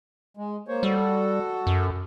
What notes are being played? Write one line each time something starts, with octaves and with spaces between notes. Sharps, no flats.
G#3
A#3 C5 C#5
G3 F#4 A4
F#2